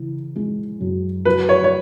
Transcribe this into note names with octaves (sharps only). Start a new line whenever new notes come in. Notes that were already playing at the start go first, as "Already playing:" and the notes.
Already playing: C#3 E3
G#3
F#2
F#3 B4
C#5
C#5